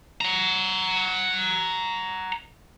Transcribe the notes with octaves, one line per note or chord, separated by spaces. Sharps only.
F#5 A#5